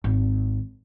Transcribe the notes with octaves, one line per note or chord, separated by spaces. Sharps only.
G#1